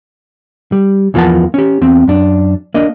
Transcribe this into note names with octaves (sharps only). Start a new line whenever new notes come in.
G3
E2 E3 F3 A#3 F#5 A5
C#4 G4
E2 C4
F#2 D4
A#3 D4 D#5